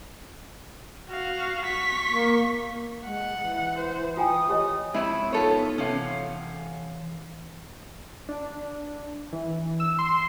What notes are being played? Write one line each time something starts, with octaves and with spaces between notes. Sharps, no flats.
F#4 F5
C#6 B6
A#3
G#3 F#5
E3
C5
F4 G5 G#5 D#6
G4 C#5 D#5
F2 G#3 E4 C#5
B3 D#4 F4 A4 B4 C#5
C3 E3 C#4 F5 F#5
D4
E3
E6
C6